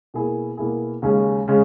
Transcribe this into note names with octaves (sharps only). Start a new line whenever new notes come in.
B2 A#3 E4 G#4
B2 A#3 E4 G#4
D#2 C#3 G#3 C#4 G#4
C#3 G#3 C#4